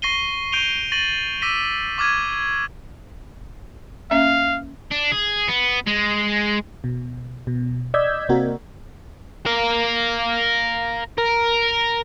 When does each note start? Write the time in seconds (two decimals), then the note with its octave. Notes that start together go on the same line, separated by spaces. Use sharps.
0.02 C#6 A#6 C7 D#7 G7
0.52 C#6 G6 D7 D#7 F7 G7
0.92 C#6 A6 A#6 D#7 F#7
1.42 D6 E6 A#6 B6 D#7
1.98 C#6 D6 F6 G#6 D#7
4.11 A#3 C#4 E5 F5
4.91 D4
5.12 G#4
5.48 B3
5.87 G#3
6.84 B2
7.47 B2
7.94 D5 D#5 E6 G6 G#6 B6
8.29 C3 A#3 C4 F#4 A#4
9.46 A#4 F5
11.18 A#4